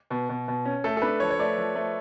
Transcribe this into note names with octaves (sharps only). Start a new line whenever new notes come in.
B2
B2
B2
C#4
A3 A4
A4
D4 B4
F3 C#5
C#5
A3 D5
F3
A3